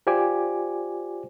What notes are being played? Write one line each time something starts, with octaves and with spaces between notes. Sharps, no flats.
F4 G4 C5 D5 G#5 D6